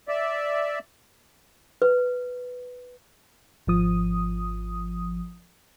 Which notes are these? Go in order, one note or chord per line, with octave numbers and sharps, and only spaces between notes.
D5 E5
B4
G#1 F3 D#6